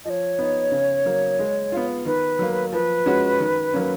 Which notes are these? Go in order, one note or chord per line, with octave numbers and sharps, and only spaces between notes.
F3 C#5 D#5
B3 D#4
C#3
F#3 A#3
G#3
B3 F4
D#3 B4
F#3 A#3
F3 B4
G#3 C#4 F#4
D#3
F#3 A#3 C#4